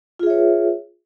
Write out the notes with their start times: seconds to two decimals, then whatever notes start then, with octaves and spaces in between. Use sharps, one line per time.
0.19 F4
0.23 G#4
0.27 E5
0.30 C#5
0.34 B4